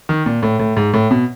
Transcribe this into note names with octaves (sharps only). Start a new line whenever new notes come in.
D#3
A#2
A2
A2
G#2
A2
B2